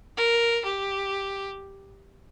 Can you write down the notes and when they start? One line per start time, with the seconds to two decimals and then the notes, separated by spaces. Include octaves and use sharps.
0.17 A#4
0.65 G4